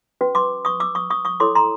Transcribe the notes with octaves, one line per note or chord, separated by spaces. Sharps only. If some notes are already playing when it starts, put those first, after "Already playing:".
C#4 F#4 B4
C6 D6
C#6 D#6
D6 E6
C#6 D#6
C#6 D#6
C#6 D#6
E4 A4 C#5 C6 D6
A#5 C6